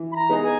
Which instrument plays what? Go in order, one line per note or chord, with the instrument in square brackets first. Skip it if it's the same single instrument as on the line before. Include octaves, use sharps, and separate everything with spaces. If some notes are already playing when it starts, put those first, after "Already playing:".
Already playing: [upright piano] E3
[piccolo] B5
A#5
[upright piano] G#3 B3 D#4 G#4
[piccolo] G#5